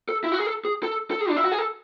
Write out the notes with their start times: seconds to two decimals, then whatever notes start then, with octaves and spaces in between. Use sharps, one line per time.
0.09 A4
0.24 E4
0.32 F#4
0.39 G#4
0.47 A4
0.65 G#4
0.83 A4
1.11 A4
1.21 G#4
1.30 D4
1.37 E4
1.44 F#4
1.52 G#4
1.58 A4